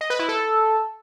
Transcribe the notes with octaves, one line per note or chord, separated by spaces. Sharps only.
D#5
B4
E4
A4